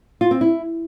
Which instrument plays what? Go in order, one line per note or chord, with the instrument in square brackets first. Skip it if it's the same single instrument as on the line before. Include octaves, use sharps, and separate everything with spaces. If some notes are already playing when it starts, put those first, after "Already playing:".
[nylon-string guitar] F4
C4
E4